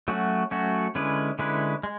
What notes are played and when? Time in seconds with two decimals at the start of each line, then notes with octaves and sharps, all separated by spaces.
0.08 F#3 A3 C#4 F#4
0.51 F#3 A3 C#4 F#4
0.95 D3 G#3 C#4 E4 B4
1.39 D3 G#3 C#4 E4 B4
1.83 G#3